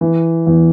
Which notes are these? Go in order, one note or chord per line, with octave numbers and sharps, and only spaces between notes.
E3
E2